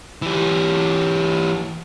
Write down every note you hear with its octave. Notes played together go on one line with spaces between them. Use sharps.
E3 G4